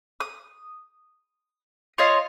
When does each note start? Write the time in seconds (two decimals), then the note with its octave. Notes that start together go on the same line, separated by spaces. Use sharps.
0.20 D#6
1.98 F4 C#5 D#5 F5